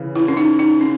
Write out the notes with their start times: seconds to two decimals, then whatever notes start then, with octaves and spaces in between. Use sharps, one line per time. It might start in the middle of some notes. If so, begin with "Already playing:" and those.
Already playing: C#3 E3
0.16 E4
0.28 C#4
0.37 D#4
0.59 D#4
0.81 C#4